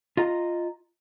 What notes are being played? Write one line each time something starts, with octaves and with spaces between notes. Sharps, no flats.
F4 D#5 A#5